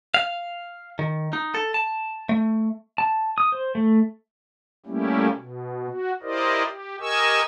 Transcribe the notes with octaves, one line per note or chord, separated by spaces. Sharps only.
F5
D#3
D#4
A4
A5
A3
A5
D#6
C5
A3
G3 A3 A#3 C#4 E4 G4
B2
F#4
E4 G4 A#4 C5 D5 D#5
G4
G4 A#4 D#5 G#5 C#6 E6